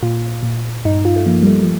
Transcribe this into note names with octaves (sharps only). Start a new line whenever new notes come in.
A#2 F4
A#2
G2 D#4
F4
A3
F3 A#3
G3
A3
F3